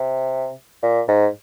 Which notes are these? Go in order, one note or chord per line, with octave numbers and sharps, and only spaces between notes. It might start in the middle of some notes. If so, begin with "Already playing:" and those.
Already playing: C3
A#2
G#2